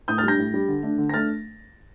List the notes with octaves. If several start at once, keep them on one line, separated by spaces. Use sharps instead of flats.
A2 D#6 G6
F6 A6
G3 D4 G6 A#6
A2
G3 D4
D3
A3 D4
D3
A#6
A3 D4 F6 A6